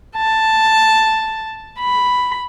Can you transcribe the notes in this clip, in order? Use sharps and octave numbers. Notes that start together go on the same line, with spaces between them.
A5
B5